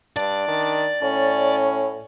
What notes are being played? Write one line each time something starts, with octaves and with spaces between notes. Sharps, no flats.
G2 D4 D5
D#3
A2 C#4